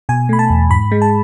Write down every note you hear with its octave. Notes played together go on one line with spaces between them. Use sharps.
B2 G#5
A3 B5
A5
E2
G#2 B5
G#3
A5